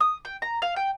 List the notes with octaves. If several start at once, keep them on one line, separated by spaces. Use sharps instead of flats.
D#6
G5
A#5
F5
G5